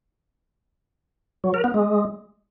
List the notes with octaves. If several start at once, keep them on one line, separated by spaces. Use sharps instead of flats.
F#3
A#4
B3
G#3